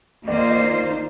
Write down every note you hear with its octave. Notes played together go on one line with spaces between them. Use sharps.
D#3 A#3 F4 C5 D5
D#5
D5
D#4
D#4